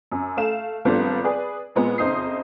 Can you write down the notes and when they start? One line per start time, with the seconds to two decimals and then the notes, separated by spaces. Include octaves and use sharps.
0.12 F#2
0.37 A3 F5 E7
0.85 G#1 F3 G3 A3 B3 D4
1.24 G#4 B4 D5
1.75 A#2 G#3 B3 C4
1.98 F#1 F2 D#4 C5 D#6 C7